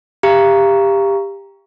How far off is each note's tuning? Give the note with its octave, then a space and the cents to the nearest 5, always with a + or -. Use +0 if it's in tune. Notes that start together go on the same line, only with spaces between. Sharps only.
G4 +20 F5 -25 A#5 +5